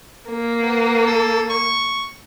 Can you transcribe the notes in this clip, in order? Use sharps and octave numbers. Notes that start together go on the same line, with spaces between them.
A#3
B3
A4
C#6